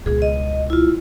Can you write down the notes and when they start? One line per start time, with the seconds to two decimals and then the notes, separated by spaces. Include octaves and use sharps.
0.06 C#2 B2 G#4
0.22 D#5
0.70 E4 F4